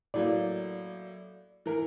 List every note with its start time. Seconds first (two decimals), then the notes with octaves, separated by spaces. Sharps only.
0.14 A2 F#3 A#3 D5
1.66 E3 A#4